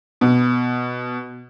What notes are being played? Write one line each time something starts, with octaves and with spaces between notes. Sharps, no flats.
B2